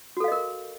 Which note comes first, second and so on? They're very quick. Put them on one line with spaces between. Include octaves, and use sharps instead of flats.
F#4 A4 F5 D#5 A#4